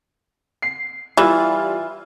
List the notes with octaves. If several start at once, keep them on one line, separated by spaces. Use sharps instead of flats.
C7
E3 G3 F4